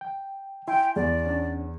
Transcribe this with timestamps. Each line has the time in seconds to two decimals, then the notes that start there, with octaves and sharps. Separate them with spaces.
0.01 G5
0.68 E4 G5 G#5 C6
0.96 E2 D5
1.26 C#4 D4